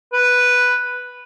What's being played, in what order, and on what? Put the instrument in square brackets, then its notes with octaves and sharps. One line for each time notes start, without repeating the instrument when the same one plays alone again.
[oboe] B4